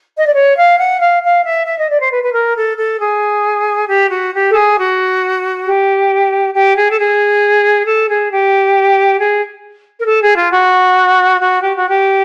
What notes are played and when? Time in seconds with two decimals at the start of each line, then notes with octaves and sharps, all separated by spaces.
0.18 D#5
0.26 D5
0.34 C#5
0.57 F5
0.78 F#5
1.00 F5
1.23 F5
1.45 E5
1.66 E5
1.78 D#5
1.89 D5
2.01 C5
2.11 B4
2.23 B4
2.33 A#4
2.55 A4
2.77 A4
3.00 G#4
3.88 G4
4.10 F#4
4.32 G4
4.49 A4
4.54 G#4
4.77 F#4
5.65 G4
6.54 G4
6.75 G#4
6.89 A4
6.98 G#4
7.86 A4
8.09 G#4
8.30 G4
9.18 G#4
9.99 A#4
10.07 A4
10.22 G#4
10.36 F4
10.51 F#4
11.40 F#4
11.61 G4
11.75 F#4
11.89 G4